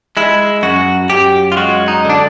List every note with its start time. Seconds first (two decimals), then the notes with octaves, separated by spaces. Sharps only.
0.17 G#3 E4
0.63 F#2 F#4
1.10 F#2 G4
1.52 F4
1.56 G#3 F#4
1.88 D#4
2.05 D3 D4